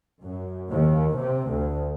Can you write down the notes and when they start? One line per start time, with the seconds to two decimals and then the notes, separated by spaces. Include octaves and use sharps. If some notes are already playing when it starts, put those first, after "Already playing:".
0.21 F#2
0.71 D#2
1.16 C3
1.50 D2